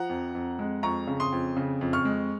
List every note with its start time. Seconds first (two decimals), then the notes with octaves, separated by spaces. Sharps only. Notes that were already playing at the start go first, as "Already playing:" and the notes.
Already playing: F3 F#5 A#5
0.10 F2
0.35 F2
0.59 G#3
0.83 F2 A#5 C#6
1.07 C#3
1.20 C6 D#6
1.32 F2
1.57 C#3
1.81 F2
1.93 C#6 F6
2.05 G#3